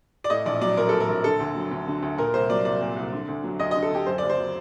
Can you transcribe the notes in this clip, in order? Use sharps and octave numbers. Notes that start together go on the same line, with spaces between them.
D5
A2 D#5
A#1 D5
F#3 D5
A#1 A#4
A2 A4
A#4
A#1
D3 A4
D2
F#3
D2
D3
D2
A#2 A#4
C2 C5
F#3 D5
C2 D5
A#2
C2
D3
D2
F#3
D2 D#5
D#5
D3
A4
D2 G4
F#2 C5
D5
F#1
C5
F#3